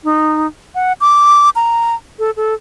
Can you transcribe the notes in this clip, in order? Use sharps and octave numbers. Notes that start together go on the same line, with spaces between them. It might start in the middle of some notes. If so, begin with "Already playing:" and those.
D#4
F#5
D6
A#5
A4
A4